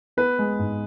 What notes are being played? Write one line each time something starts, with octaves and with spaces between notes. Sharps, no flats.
B3 B4
G#3
G#2